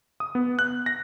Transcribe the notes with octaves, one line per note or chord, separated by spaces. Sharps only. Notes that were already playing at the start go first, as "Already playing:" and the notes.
D#6
B3
F#6
A#6